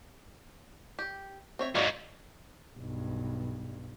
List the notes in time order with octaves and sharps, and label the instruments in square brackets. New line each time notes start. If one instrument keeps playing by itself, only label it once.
[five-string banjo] G4
C4 C#5 E5
[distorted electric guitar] G#2 F#3 [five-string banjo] F#4 D5 F5
[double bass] B1 G2